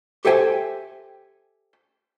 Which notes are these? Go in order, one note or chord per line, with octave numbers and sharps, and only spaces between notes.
G4 A4 C5 E5 G5 G#5